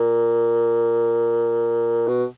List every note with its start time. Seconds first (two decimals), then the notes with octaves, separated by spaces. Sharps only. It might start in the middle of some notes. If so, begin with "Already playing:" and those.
Already playing: A#2
2.07 B2